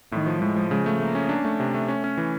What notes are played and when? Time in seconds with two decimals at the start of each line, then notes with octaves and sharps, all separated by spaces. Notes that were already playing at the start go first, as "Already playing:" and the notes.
0.12 A2 D#3
0.26 F3
0.42 A2 G#3
0.56 F3
0.71 C#3
0.86 A3
1.00 A3 A#3
1.15 C#4
1.29 D4
1.45 A3
1.60 C3
1.74 A3
1.88 C#4
2.04 C#4
2.18 E3